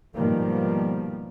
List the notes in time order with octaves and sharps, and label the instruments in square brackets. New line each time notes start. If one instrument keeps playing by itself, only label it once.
[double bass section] G#2 B2 D#3 F3 G3 A#3